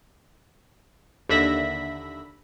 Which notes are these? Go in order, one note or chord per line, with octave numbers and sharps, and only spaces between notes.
D#2 D3 E5 B5 A#6 B6